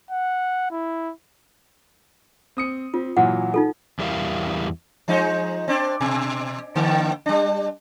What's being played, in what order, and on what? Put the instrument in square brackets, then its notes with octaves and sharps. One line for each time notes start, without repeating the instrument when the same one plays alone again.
[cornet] F#5
E4
[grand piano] C4 D#6 C#7
[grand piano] C4 [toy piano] F4
[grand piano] A#2 E3 F#3 [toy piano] F#5
[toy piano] D#4 F4 A4
[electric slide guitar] E2 G3 A3 E4 A#4 F5
[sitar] F3 G#3 D#4
C4 D4
B2
G2 D3 A#3
G3 D4